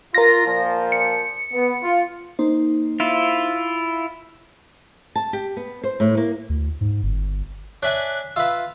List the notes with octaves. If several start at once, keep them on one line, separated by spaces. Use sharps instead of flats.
F4 A#4 A#6
A#2 F3
C#7
B3
F4
A#3 D#4 C5
E4 F4
A5
G4
B3
C5
A2
A#3
D2
G#2
G1
D4 C#5 E5 G#5 F#6
F4 B4 E5 F5 E6